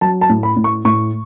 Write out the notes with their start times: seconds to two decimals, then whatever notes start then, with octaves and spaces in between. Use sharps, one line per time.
0.01 F#3 A5
0.21 A5
0.29 A2
0.43 B5
0.56 A2
0.64 C#6
0.85 A2 C#6